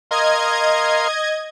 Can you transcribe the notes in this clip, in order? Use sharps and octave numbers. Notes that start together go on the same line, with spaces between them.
A#4 D#5 F5 C6 G#6